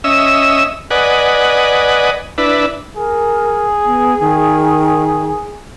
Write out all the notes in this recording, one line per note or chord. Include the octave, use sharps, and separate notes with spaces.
C#4 D#5 E5 E6
B4 D5 D#5 F#5 G#5
D4 E4 B4
G#4 A#4
B3
D#3